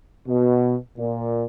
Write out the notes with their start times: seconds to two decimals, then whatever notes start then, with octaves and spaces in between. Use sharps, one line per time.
0.28 B2
0.97 A#2